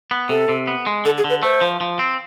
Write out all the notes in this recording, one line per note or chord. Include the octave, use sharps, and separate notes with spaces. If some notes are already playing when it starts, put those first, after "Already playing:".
B3
C3 A4
C3
B3
G#3
D3 A4
G#4
D3
B4
A3 C5
F3
F3
C4